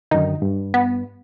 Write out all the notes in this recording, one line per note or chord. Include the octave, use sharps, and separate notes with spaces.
F#2 D3 D#3 D#4
G2
B3